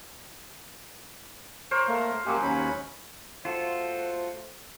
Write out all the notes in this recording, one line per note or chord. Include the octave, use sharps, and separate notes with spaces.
A#4 C5 C#5
A3 A#3
F#2 F#3 G#3 A#3 G4
D#2 C#4 B5
A3 F4 F#4 A4 C5